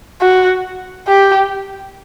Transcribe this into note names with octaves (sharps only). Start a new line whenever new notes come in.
F#4
G4